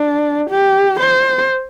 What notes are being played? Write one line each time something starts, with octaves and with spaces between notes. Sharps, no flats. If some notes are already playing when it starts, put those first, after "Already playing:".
Already playing: D4
G4
C5